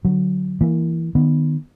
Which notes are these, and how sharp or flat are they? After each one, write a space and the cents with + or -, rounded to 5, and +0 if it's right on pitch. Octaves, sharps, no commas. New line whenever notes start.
D3 +0 F#3 +0
E3 +0 A#3 +0
D#3 -20 B3 +0